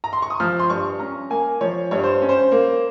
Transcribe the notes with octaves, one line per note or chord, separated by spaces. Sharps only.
A#5
C6
C#6
D#6
F3 F6
C6
G2 C#6
C#4 A#5
A#3 G#5
F3 C#5
G2 C#5
C5
C#4
C5
A#3